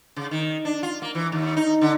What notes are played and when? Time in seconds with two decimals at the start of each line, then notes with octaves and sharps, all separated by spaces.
0.16 C#3
0.31 D#3
0.65 D4
0.83 F4
1.02 A#3
1.15 E3
1.32 D#2
1.57 D#4
1.81 D3